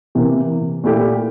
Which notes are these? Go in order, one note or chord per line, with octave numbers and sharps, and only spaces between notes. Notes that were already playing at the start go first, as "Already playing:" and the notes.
C3 E3 A#3
A#2 A3 E4 G4